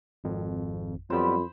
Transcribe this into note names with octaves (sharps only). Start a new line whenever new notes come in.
G#1 F2
F2 F#3 G3 B3 C5 B5